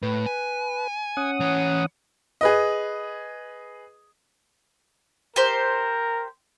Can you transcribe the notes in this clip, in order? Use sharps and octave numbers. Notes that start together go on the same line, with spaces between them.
A2 B4
G#5
C#4 F#5 D#6
E3 C#5
G#4 B4 D#5
G4 A#4 C5